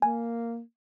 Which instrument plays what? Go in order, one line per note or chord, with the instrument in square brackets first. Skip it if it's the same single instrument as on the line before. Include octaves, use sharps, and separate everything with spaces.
[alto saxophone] A#3 [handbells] G#5